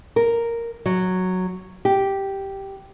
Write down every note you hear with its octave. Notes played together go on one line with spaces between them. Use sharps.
A#4
F#3
G4